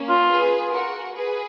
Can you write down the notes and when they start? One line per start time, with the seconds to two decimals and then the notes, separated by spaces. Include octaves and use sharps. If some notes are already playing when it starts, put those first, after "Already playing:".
Already playing: A#3 C#4
0.09 F4
0.30 G#4 B4
0.73 F#4 A#4
1.16 G#4 B4